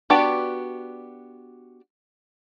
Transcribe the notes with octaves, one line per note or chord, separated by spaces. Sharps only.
B3 D4 F#4 G4 D5